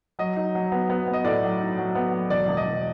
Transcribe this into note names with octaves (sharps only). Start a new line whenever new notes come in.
F#3 D#5
D#4
F#3
B3
B3
B3
D#5
A2 D5
F#3
D#4
F#3
B3
F#3
E1 D5
E1
D#5
E1